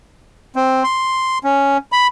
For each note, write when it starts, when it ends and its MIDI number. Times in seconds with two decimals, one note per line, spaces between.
0.56 0.83 60
0.84 1.38 84
1.44 1.77 61
1.92 2.07 83